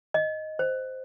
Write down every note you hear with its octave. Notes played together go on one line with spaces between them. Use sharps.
D#5
C5